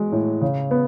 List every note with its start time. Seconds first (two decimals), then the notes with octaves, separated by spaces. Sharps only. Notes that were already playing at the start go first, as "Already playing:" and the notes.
Already playing: G#3 F#4
0.12 A2
0.42 C#3
0.71 B3